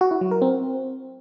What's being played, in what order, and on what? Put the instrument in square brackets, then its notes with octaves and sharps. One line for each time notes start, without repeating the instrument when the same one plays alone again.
[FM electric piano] F#4
E4
F#3
A#4
C4